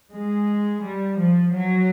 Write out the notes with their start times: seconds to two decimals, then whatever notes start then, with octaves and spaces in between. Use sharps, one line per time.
0.12 G#3
0.82 G3
1.19 F3
1.54 F#3